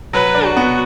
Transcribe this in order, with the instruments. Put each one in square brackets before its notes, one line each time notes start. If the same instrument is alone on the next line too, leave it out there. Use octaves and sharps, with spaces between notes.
[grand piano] F#3 [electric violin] B4
[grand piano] D4
[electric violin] F#4
[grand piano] B3